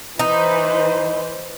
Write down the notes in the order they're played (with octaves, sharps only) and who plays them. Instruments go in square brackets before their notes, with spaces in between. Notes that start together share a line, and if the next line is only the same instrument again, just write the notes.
[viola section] E3 B4 C5 [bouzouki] D#4